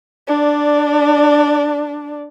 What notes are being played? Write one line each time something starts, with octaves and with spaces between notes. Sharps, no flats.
D4 D5